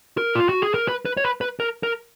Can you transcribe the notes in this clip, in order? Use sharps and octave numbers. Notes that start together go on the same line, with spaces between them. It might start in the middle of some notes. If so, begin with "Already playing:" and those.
A#4
F4
F#4
G#4
A#4
B4
B4
C#5
B4
B4
A#4
A#4